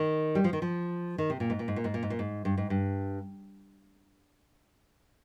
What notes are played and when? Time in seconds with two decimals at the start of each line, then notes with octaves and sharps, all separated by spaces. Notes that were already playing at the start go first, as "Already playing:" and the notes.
Already playing: D#3
0.35 G3
0.44 F3
0.53 D#3
0.62 F3
1.18 D#3
1.30 C3
1.40 A#2
1.50 G#2
1.59 A#2
1.68 G#2
1.76 A#2
1.84 G#2
1.94 A#2
2.03 G#2
2.10 A#2
2.19 G#2
2.45 G2
2.57 G#2
2.70 G2